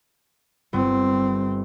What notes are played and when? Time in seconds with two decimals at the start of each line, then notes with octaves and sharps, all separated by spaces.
0.73 G1 C4